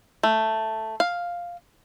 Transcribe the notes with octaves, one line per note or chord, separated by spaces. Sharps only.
A3
F5